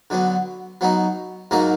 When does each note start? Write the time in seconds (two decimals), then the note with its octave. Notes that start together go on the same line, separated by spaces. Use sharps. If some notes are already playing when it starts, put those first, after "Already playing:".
0.10 D3 F#3 B3
0.81 F#3 B3 D#4
1.51 G#2 F#3 A#3 D#4 A#4